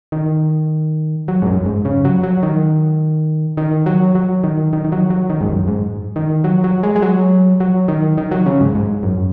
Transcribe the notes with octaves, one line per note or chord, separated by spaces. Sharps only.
D#3
F#3
G#2
F#2
G#2
C#3
F#3
F#3
D#3
D#3
F#3
F#3
D#3
D#3
D#3
F#3
F#3
D#3
G#2
F#2
G#2
D#3
F#3
F#3
G#3
G#3
F#3
F#3
D#3
D#3
F#3
C#3
G#2
G#2
F#2